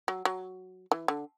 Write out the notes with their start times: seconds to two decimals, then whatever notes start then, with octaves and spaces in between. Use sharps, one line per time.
0.08 F#3
0.25 F#3
0.91 E3
1.08 D3